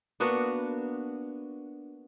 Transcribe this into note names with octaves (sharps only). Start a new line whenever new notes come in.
A#3 B3 D4 F#4